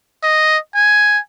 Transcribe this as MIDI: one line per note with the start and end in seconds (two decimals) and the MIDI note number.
0.23 0.58 75
0.75 1.19 80